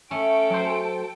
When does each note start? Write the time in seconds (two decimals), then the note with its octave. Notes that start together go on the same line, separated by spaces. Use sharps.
0.11 A3 C#4 A4 G5 D7
0.50 F#3 C5